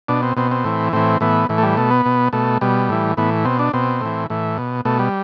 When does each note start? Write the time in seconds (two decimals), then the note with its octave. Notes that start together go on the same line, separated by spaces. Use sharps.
0.08 B2 D4
0.22 C4
0.36 B2 C4
0.51 C4
0.65 A2 E3
0.93 A2 E3 C4
1.21 A2 E3 B3
1.49 A2 E3
1.58 A3
1.63 G3
1.77 B2 A3
1.91 B3
2.05 B2
2.33 B2 A3
2.61 B2 G3
2.89 A2 E3
3.17 A2 E3 B3
3.45 B2 C4
3.59 D4
3.73 B2 C4
4.01 A2 E3
4.30 A2 E3
4.58 B2
4.85 B2 A3
4.99 G3